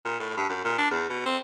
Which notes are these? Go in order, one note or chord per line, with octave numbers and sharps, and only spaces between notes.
A#2
A2
G2
F#2
A#2
D4
E2
B2
C4